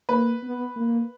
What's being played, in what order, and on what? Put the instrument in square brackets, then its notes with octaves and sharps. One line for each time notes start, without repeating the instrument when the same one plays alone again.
[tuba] A#3 [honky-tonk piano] B4
[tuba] B3
A#3